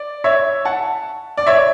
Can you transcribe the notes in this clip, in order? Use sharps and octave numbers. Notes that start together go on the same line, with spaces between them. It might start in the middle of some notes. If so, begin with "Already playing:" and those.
Already playing: D5
C#5 E5
F#5 A5
D5
C#5 E5